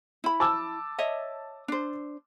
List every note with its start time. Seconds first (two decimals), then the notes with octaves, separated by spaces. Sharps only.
0.24 E4 B5
0.40 A5 D6 E6
0.98 C#5 D#5 E5
1.68 D4 C5